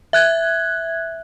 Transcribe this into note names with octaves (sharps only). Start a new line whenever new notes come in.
E5 F#6 G#6